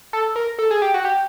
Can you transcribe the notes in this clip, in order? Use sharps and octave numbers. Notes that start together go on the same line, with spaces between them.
A4
A#4
A4
G#4
G4
F#4
G4